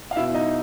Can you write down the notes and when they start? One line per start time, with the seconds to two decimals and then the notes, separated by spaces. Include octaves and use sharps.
0.11 F5
0.16 B2 E4 E5
0.34 D#4 D#5